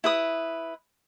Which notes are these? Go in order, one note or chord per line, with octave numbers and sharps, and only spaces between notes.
E4 B4 D#6